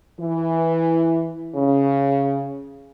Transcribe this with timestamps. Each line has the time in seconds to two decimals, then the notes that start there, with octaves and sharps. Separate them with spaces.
0.18 E3
1.55 C#3